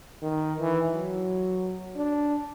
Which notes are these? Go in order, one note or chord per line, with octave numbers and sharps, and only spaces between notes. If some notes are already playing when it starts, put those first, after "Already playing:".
D#3
E3
F#3
D4